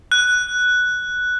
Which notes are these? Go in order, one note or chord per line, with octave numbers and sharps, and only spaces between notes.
F#6